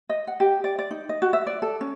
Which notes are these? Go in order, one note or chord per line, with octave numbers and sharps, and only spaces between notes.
D#5
F#5
G4
D5
D5
D#4
D#5
F#4
E5
D5
A4
C#4